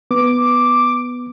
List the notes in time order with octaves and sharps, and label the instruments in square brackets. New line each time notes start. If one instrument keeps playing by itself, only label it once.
[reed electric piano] B3 [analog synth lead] D6